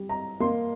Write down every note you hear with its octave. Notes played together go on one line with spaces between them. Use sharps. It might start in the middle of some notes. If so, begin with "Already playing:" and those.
Already playing: G3
A#5
A#3 C6